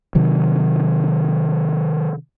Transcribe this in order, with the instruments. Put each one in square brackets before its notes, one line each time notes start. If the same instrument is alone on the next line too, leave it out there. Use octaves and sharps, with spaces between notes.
[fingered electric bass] C3 D#3 F#3